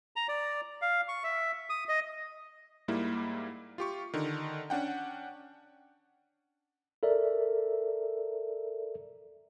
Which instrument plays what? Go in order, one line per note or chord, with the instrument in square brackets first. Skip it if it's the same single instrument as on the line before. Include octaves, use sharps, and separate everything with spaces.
[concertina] A#5
D5
F5
C#6
E5
D#6
D#5
[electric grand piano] G#2 G3 A#3 E4
F4 G4 C#6
D3 D#3
C#4 D4 F#5 G5
[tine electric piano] A4 A#4 D5 E5